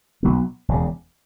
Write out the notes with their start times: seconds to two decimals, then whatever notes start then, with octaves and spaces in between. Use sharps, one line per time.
0.23 B1 B2 F#3 B3
0.68 E1 E2 C#3